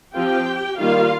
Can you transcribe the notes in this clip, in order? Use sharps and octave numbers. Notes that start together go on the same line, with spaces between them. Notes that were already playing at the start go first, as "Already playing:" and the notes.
F3 C4 F4 G4 G5
D#3 G3 A#3 F4 F5